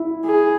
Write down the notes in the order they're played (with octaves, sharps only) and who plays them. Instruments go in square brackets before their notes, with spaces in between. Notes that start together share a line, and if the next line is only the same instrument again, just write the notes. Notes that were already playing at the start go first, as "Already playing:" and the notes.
Already playing: [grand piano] E4
[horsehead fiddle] G#4